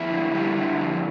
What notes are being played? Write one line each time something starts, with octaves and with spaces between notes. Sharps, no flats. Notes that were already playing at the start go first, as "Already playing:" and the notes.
Already playing: F2 E4
D3
G3
D3
F2